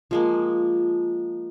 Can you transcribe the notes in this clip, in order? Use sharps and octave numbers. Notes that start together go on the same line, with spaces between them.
F3 G#3 A#3